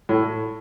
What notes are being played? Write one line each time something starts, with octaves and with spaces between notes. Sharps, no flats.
A2